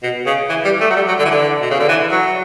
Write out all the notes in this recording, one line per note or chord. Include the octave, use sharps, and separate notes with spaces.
B2
C#3
E3
G3
A3
F#3
G3
F#3
D3
E3
D3
B2
C#3
D3
E3
F#3